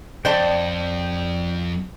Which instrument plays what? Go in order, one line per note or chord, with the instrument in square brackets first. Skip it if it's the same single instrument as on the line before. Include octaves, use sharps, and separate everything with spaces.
[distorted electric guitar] F2 [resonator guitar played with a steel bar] C5 D5 A5 [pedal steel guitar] G5